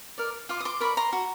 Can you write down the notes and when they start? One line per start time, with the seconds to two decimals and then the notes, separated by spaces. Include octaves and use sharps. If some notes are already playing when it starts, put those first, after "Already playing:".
0.18 A#4 D5
0.49 F4 C6 D6
0.60 D#6
0.65 C6 D6
0.80 A#4 D5 B5 C#6
0.97 A#5 C6
1.13 F#4